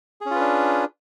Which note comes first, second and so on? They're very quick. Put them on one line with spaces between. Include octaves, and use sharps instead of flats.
G#4 C#4 F4 B4 D4